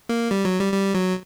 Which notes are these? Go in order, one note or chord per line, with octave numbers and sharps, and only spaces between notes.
A#3
G3
F#3
G3
G3
F#3